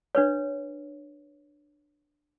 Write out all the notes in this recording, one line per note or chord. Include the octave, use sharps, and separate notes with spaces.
D4 B4 C#5